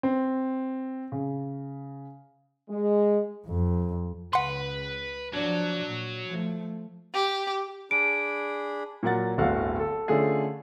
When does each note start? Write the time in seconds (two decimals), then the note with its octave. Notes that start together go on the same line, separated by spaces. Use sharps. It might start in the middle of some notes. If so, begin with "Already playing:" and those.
0.03 C4
1.12 C#3
2.69 G#3
3.46 F2
4.33 C#2 C#3 B4 F#5 C6
5.34 F3 F#3 D4
5.84 A#2
6.28 F3 A3
7.13 G4
7.91 D4 G#4 B5 D7
9.03 A#2 F#3 A#4 F#5 A6
9.38 D1 G1 A3 F#4 F5 F#5
9.79 A4
10.08 D3 A3 C#4 F4 G#4